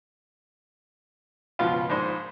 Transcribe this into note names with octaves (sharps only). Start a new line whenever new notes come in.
C#2 B2 F3 F4 F5
A#1 G#2 C5